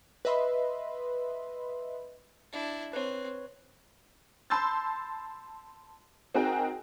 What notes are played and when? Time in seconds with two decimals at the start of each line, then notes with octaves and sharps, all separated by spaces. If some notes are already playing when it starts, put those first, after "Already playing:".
0.25 B4 D#5 E5 B5 C6
2.52 D4 E4
2.93 C4 B4 C#5
4.50 A5 B5 C6 E6 G6 A6
6.34 C4 D#4 F#4 G#4 A#4 G5